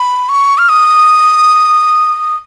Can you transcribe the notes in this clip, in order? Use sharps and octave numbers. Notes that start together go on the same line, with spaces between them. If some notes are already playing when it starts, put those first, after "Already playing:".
Already playing: B5
C#6
F6
D#6